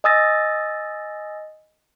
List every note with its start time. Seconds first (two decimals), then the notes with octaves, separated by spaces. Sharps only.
0.04 D#5 G#5 D#6 E6 A6 A#6